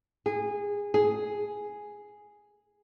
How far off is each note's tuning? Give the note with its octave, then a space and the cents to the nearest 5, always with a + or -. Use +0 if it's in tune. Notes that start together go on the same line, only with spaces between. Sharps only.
G#4 -20
G#4 +0